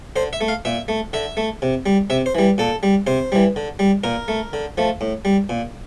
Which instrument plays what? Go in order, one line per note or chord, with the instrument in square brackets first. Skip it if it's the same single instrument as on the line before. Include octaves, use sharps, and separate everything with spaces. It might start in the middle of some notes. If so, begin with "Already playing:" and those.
[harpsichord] D3 C5
E5
A3
F5
A#2 E5
A3
D3 E5
A3
C3
G3
C3 E5
C5
E3 G3
A#2 A4
G3
C3 C5
E3 G3
D3
G3
A#2 A#4
A3
D3
F3 A3
A2
G3
A#2